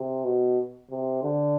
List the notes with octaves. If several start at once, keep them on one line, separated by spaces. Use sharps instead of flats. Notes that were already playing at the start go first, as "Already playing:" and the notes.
Already playing: C3
B2
C3
D3